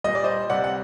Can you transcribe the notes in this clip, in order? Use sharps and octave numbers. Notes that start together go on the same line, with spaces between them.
A#2 G3 D#5
D5
C5 D#5
C3 G3 D5 F#5
F#5